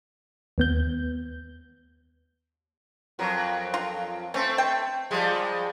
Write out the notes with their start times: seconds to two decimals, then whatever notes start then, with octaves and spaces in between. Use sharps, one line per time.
0.58 D#2 B3 G6
3.19 F2 F#3 A#4
3.74 F4
4.34 A3 C4 C#4
4.58 G5
5.11 F3 G3 G#3